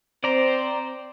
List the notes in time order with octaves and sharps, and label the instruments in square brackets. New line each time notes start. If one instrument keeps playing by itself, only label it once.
[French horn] C4 [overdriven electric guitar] C5 [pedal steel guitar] D5 A#5